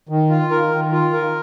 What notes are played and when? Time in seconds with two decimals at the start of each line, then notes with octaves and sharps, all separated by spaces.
0.09 D#3
0.30 F4
0.51 A#4
0.71 D#3
0.92 F4
1.13 A#4